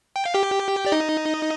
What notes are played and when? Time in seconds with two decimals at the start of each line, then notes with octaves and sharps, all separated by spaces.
0.16 G5
0.25 F5
0.34 G4 G5
0.86 D5
0.92 D#4 D#5